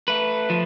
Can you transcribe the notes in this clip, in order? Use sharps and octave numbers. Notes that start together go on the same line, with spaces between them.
A3 B4
F3